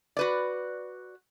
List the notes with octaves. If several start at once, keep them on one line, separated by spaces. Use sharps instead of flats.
F#4 B4 D5